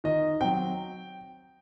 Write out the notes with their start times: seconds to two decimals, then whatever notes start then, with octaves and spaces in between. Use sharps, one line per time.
0.04 D#3 D#5
0.40 F#3 C4 G5